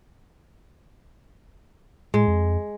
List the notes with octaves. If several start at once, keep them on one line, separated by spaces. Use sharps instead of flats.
A2 G#3
F2